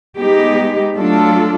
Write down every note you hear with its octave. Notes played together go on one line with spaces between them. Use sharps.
G#3 B3 D#4 G4
F#3 A3 D4 F4 A4